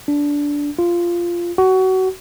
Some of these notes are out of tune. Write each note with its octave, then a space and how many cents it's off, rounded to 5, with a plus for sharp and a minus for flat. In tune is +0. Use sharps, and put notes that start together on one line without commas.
D4 -15
F4 -10
F#4 +25